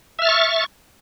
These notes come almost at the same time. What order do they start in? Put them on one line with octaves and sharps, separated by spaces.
E5 F6 A6 C#6